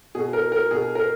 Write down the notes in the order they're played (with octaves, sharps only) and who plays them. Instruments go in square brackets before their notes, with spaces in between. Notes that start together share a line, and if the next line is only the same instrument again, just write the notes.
[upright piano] B2 G#4
A#4
A#4
B2 G#4
A#4